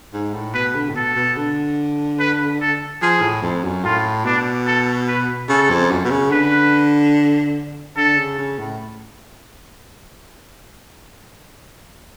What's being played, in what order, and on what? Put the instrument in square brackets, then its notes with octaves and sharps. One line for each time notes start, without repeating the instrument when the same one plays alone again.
[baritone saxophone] G#2
A2
[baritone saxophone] B2 [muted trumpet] B4
[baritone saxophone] D3
A2
[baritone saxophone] B2 [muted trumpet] A4
[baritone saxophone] B2
D3
[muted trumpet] B4
A4
[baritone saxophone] F3 [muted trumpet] G#4
[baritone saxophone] A2
F2
F#2
[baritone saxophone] A2 [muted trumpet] F4
[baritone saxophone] B2 [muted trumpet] D4
[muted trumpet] A4
B4
[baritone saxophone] C#3 [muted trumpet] A4
[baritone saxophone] F2
F#2
B2
C#3
[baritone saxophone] D3 [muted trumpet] B4
[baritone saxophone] D3 [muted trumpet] A4
[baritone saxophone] C#3
C#3
A2